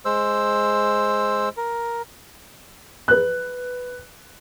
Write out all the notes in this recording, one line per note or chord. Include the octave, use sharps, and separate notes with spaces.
G#3 C5 E6
A#4
B4 F#6